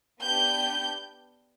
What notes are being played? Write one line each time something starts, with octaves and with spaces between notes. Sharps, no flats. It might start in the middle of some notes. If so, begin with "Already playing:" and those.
B3 D4 G4 G6